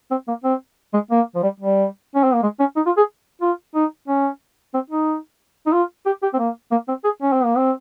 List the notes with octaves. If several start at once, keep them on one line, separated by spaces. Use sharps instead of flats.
C4
A#3
C4
G#3
A#3
F3
G3
G3
C#4
C4
A#3
G#3
C#4
D#4
F4
G#4
F4
D#4
C#4
C4
D#4
D#4
F4
G4
G4
C4
A#3
A#3
C4
G#4
C#4
C4
A#3
C4